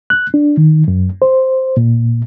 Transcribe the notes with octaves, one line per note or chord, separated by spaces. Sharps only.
F#6
D4
D#3
F#2
C5
A#2